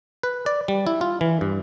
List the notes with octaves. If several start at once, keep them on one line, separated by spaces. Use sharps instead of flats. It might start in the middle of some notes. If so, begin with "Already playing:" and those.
B4
D5
G3
E4
F4
E3
G2